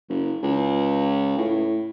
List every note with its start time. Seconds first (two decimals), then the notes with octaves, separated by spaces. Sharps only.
0.09 F#1
0.43 C#2
1.38 A2